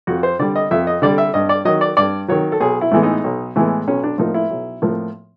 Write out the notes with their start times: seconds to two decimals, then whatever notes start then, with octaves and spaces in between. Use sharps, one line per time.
0.07 F2 F#4
0.23 C5
0.39 D3 G3 D5
0.56 D#5
0.71 F2 E5
0.87 D#5
1.02 D3 G3 D5
1.18 E5
1.34 G2 D#5
1.49 D5
1.65 D#3 F#3 D#5
1.81 D5
1.97 G2 D5
2.28 D#3 F#3 C#5
2.52 A4
2.60 B1 G#4
2.81 E4
2.92 A2 E3 G#3 B3
3.03 D#4
3.24 B1
3.56 A2 E3 G#3 B3
3.87 B1 C#4
4.04 D4
4.18 A2 F3 A#3 D#4
4.34 E4
4.50 B1
4.82 A2 F3 A#3